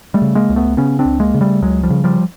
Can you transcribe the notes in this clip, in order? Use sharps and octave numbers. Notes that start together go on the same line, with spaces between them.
G3 A3
C#3
G#3 A#3
C#2
A3 B3
C#3 B3 C#4
C4 D4
C#2
G#3 A#3
C#3
G3 A3
C#2 F#3 G#3
F3 G3
C#3
F3 G3